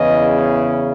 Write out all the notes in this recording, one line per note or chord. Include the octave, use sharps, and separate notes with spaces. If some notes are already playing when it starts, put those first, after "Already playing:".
Already playing: E2 C#3 E3 D#5